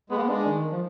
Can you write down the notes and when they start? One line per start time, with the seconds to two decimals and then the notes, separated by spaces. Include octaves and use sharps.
0.10 G#3 B3
0.16 A#3
0.28 G#3 D4
0.45 D#3
0.72 F3